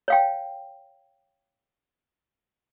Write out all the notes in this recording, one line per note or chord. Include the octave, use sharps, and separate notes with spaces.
C#5 F5 G5